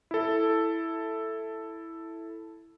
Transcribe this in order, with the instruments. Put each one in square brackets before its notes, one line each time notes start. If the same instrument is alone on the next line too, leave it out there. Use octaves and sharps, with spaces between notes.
[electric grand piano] E4 A4